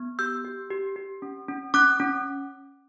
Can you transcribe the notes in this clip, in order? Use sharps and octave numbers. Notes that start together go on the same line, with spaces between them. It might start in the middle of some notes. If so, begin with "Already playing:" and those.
Already playing: B3
G4 E6 G6
G4
G4
G4
C#4
C#4
C#4 D6 F#6
C#4